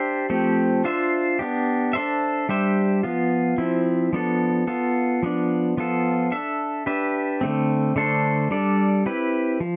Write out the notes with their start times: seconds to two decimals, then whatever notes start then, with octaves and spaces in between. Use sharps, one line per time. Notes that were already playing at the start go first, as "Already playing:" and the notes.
Already playing: D4 G4 C5 E5
0.30 F3 A3 C4 G4
0.84 D4 F4 C5 E5
1.39 B3 D4 G4
1.93 D4 A4 C5 E5
2.49 G3 D4 G4 C5 E5
3.03 F3 B3 F4
3.58 F3 C4 E4
4.13 F3 B3 D4 A4
4.67 B3 F4 A4
5.23 F3 B3 D4
5.77 F3 B3 F4 A4
6.32 D4 A4 E5
6.86 D4 G4 B4 E5
7.41 D3 A3 C4
7.96 D3 A3 D4 A4 C5
8.51 G3 D4 A4 D5
9.06 C4 E4 G4 B4
9.60 F3